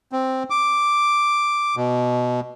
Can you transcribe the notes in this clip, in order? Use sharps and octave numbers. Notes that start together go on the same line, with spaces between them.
C4
D6
B2